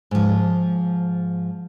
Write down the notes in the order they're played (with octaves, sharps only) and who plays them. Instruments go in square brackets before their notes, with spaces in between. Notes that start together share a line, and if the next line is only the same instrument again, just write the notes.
[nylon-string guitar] G#2 F3